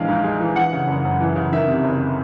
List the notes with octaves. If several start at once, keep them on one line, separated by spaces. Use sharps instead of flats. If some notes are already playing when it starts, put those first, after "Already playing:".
Already playing: A#1 E3 G#3 F5
G#2
G#3
E3
E3 F#5
C#3
F#1
F#2
E3
C#3
D#3 E5
C3
F#1